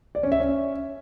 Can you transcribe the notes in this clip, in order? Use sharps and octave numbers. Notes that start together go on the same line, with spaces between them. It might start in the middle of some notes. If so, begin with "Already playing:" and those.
D5
C#4
E5
C#4